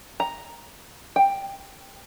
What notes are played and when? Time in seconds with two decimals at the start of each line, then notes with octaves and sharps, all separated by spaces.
0.20 A#5
1.16 G5